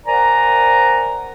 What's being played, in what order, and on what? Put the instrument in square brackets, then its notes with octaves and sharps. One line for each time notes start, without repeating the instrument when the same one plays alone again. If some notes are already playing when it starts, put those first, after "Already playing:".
[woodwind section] A#4 C5 D5 F#5 G#5 A#5